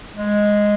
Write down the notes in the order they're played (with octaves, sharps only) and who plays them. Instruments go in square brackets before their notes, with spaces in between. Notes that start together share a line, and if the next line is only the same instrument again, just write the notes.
[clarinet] G#3